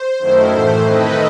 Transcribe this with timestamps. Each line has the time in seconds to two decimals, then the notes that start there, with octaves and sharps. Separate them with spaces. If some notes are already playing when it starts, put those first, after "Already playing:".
Already playing: C5
0.19 F#2 D#3 A3 E4
0.51 A2 E3 A3 C5
0.83 D#3 A3 C4 E4 B4 D#5